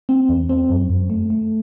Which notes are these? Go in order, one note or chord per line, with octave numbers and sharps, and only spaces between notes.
C4
E2
C4
F#2
F#2
A3
A3